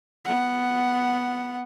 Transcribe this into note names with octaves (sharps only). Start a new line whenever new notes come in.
B3 F#5